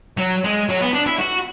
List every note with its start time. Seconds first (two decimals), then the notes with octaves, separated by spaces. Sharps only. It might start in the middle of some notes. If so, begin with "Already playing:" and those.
0.17 F#3
0.44 G#3
0.69 F#3
0.82 B3
0.94 D4
1.07 E4
1.19 F#4